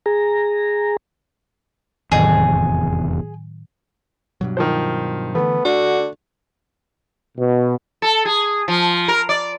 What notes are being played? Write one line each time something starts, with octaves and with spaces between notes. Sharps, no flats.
G#4 A#5
F1 E2 A2 D#3 F#3 G#4
G2 B2 F#3
D#3 F3 C5
D3 E3 A3 B3
D3 D4 F#4
B2
A4
G#4
F3
A#4
D5